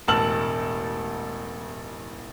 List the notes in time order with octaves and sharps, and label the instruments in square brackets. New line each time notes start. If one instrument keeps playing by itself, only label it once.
[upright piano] E1 A1 A5 E6 F6 F#7